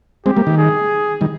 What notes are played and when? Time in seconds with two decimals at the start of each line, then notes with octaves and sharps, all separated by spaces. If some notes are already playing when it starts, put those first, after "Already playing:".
0.26 G#3 C4 G4
0.37 G3 A#3
0.47 D#3
0.58 G#4
1.21 D#3 G3